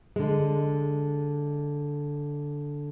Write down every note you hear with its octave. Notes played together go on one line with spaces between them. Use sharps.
D3 G#3